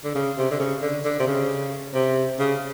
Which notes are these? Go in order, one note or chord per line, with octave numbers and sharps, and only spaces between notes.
D3
C#3
C3
D3
C#3
D3
D3
C3
C#3
C3
C#3